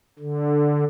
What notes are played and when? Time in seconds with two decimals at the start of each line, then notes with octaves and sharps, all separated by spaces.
0.19 D3